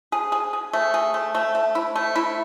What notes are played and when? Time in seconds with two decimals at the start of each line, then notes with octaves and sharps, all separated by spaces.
0.12 G#4
0.32 G#4
0.53 G#4
0.73 A3
0.94 G#4
1.14 A3
1.35 A3
1.55 A3
1.75 E4
1.96 A3
2.16 E4